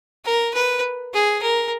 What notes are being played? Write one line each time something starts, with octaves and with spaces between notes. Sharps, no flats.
A#4
B4
G#4
A#4